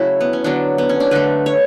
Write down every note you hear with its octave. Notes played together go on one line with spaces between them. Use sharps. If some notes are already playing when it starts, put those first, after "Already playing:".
Already playing: C#3 F#3 A3 E4 F#4
B3
C#4
D3 F#3 B3 D4
B3
C#4
D4
D3 A3 B4
C#5